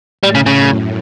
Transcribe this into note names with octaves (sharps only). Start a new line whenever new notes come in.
A2 G3
C#3
C#3
F#2